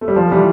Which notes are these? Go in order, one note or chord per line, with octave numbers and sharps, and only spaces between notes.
A3
G3
F3
E3 G3